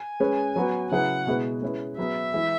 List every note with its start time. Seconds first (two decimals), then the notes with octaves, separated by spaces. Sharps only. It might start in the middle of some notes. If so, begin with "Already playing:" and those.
Already playing: G#5
0.20 G#3 C#4 G#4 B4
0.56 F#3 B3 F#4 B4
0.91 C#3 F#3 E4 G#4 B4 F#5
1.27 B2 G#3 E4 B4
1.62 G#3 C#4 E4 B4
1.98 F#3 B3 G#4 B4 E5
2.34 E3 G#3 E4 G#4